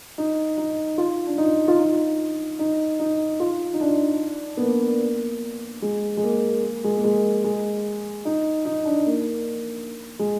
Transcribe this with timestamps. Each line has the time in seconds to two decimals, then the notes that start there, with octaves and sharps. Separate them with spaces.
0.18 D#4
0.58 D#4
0.98 F4
1.27 D4
1.38 D#4
1.68 F4
1.78 D#4
2.59 D#4
3.00 D#4
3.40 F4
3.74 D#4
3.81 D4
4.57 B3
4.62 A#3
5.82 G#3
6.17 G#3
6.24 A#3
6.63 A#3
6.84 G#3
6.97 A#3
7.04 G#3
7.44 G#3
8.25 D#4
8.65 D#4
8.85 D4
9.06 A#3
10.19 G#3